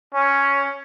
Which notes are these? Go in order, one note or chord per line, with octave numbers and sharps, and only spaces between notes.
C#4